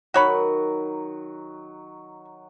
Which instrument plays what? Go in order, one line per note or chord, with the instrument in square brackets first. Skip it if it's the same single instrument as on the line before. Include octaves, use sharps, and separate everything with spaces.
[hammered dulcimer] D#3 F#3 [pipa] F#4 C#5 B5